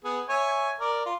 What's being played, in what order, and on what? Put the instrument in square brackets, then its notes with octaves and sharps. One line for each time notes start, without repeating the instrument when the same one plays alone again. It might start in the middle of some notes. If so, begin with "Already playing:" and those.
[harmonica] B3 G#4
C#5 E5 G#5
A#4 D5
F4